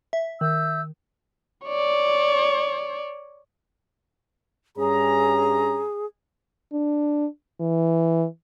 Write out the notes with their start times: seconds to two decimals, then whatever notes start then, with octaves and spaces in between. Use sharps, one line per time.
0.13 E5
0.41 D#3 E5 E6 G6
1.67 C#5 D5
4.77 G2 C#4 G#4 A#5
6.73 D4
7.60 E3